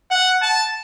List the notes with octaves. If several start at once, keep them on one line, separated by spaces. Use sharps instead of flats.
F#5
A5